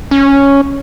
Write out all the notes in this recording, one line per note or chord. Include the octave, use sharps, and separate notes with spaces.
C#4